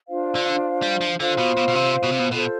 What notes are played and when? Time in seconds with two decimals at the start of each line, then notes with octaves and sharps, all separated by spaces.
0.08 D4 F4 C5 F5
0.35 D3
0.82 G3
1.01 F3
1.19 D3 F4 C5 F5
1.38 B2
1.57 B2
1.68 B2
1.75 C3
2.03 B2
2.11 C3
2.19 B2
2.31 B2 F4 A4 C5